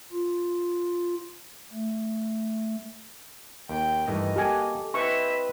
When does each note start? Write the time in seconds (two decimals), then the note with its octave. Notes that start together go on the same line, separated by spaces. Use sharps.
0.12 F4
1.73 A3
3.69 D#2 G5
4.08 G2 D#3 E3 A3 D#5
4.36 A#3 F#4 G4 A4 A#4 G#5
4.94 C4 E4 B4 D#5 E5 C#6